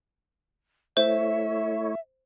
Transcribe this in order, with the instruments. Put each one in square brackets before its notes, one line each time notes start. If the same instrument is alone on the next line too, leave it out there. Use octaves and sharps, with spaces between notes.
[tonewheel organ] A3 E4 C#5 [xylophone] C5 [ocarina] E5